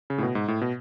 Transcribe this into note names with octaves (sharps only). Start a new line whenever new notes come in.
C#3
A2
B2
G#2
A2
B2